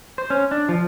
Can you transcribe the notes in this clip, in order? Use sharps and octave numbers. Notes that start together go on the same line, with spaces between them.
C5
C#4
D4
F3